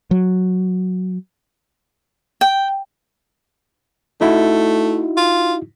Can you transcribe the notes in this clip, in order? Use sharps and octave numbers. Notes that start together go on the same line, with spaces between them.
F#3
G5
A3 D#4 E4 F#4
F4